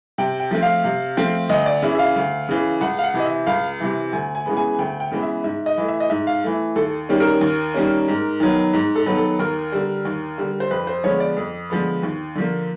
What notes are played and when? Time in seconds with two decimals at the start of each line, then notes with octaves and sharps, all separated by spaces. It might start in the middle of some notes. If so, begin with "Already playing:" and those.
0.18 C3 G5
0.40 G5
0.51 F3 A3 C4
0.62 F5
0.84 C3
1.17 F3 A3 C4
1.49 D2 D#5
1.66 D5
1.82 C#3 E3 E5
1.95 E5
1.99 F5
2.16 D2
2.49 C#3 E3
2.81 C#2 F#5
2.99 F5
3.03 F#5
3.14 C3 E3
3.20 D#5
3.25 E5
3.47 C#2 F5
3.80 C3 E3
4.13 D2 G#5
4.35 G#5
4.46 C#3 E3 G#3 B3
4.57 G#5
4.79 D2 G5
5.00 G5
5.11 C#3 E3 G#3 B3
5.23 E5
5.44 G#2 E5
5.66 D#5
5.78 E3 A3
5.88 E5
6.00 D#5
6.10 G#2 E5
6.27 F5
6.44 E3 A3
6.76 D#2 A4
7.09 D#3 G3 A#3 C#4
7.20 A#4
7.41 D#2
7.74 D#3 G3 A#3 C#4
8.08 G#2
8.40 D#3 F#3 B3
8.73 G#2
8.95 A4
9.06 D#3 F#3 B3
9.17 A4
9.39 D#2 A#4
9.72 D3 G3
10.05 D#2
10.38 D3 G3
10.60 C5
10.71 F2 B4
10.87 C5
11.03 D3 F3 G#3 B3 C#5
11.20 D5
11.37 F2
11.70 D3 F3 G#3 B3
12.03 D#2
12.35 D3 F3 A#3